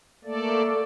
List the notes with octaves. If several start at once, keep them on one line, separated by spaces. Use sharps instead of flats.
A3 A#3 A4 D5